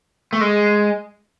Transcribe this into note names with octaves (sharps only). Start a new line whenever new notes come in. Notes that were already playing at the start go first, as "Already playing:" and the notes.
A3
G#3